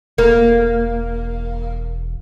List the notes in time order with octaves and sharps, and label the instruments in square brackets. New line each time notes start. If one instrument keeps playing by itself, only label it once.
[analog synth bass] E1 [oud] A#3